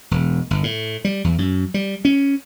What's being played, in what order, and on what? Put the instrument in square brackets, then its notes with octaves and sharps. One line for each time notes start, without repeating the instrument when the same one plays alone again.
[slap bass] E1
G1
A2
G3
E2
F#2
G3
C#4